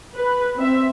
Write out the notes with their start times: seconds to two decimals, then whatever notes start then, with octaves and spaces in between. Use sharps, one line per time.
0.14 B4
0.56 C4 E5